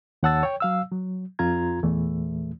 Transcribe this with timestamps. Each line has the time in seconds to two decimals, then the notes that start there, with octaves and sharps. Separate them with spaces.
0.23 D#2 C#5 F#5 A5 E6 A6
0.43 C#5 G5
0.60 F#3 F5 E6
0.91 F#3
1.39 F2 C4 F4 A#5 G#6
1.83 E2 A#2 E3 A3